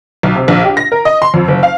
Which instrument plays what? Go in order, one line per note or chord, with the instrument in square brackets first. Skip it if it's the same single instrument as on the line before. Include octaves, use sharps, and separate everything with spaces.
[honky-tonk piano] B1
C3
A#1
G4
A#6
A#4
D#5
C6
F2
F#1
F5